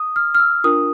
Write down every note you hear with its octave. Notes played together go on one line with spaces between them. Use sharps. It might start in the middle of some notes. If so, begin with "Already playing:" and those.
Already playing: D#6
F6
F6
E6
D4 F4 A#4 D#6